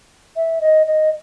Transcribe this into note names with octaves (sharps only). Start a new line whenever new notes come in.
E5
D#5
D#5